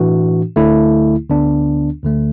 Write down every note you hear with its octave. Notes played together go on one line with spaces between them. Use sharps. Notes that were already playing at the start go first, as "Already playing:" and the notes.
Already playing: A2 E3 D4 F#4
D2 D3 A3 E4
D2 D3 B3 D4
D2 D3 A3